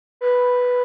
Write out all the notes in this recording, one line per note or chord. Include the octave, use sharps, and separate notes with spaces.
B4